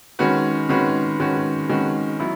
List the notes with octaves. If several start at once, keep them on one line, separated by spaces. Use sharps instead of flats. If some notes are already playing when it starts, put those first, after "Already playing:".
D#3 G#3 C#4 F#4 B4
D#3 G#3 C#4 F#4 B4
D#3 G#3 C#4 F#4 B4
D#3 G#3 C#4 F#4 B4
F#3 B3 E4